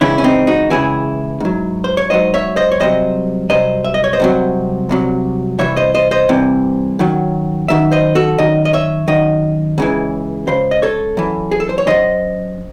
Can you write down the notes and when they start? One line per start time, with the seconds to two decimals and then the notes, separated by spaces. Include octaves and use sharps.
0.01 C#2 C#3 E3 C#4 E4
0.18 C#4
0.24 C4 D#4
0.47 D#4 F#4
0.70 C#2 C#3 E3 E4 G#4
1.40 G#2 F#3
1.84 C5
1.97 C#5
2.10 G#2 F#3 C5 D#5
2.34 C#5 E5
2.56 C5 D#5
2.72 C#5
2.80 C2 C3 F#3 C5 D#5
3.50 C2 C3 F#3 C5 D#5
3.84 E5
3.94 D#5
4.04 C#5
4.13 C5 D#5
4.20 C2 C3 F#3
4.89 C2 C3 F#3
5.59 C2 C3 E3 C#5 E5
5.76 C5 D#5
5.95 C5 D#5
6.11 C5 D#5
6.29 C2 C3 E3
6.99 F#2 D#3 F#3
7.68 F#2 D#3 E5
7.91 C5 D#5
8.15 F#4 A4
8.38 F#2 D#3 D#5
8.65 D#5
8.73 C#5 E5
9.08 F#2 D#3 D#5
9.78 C#2 C#3 E3
10.47 C#2 C#3 C5
10.71 D#5
10.82 A4 C#5
11.17 F#2 E3
11.51 G#4
11.60 A4
11.69 C5
11.78 C#5
11.87 F#2 E3 C5 D#5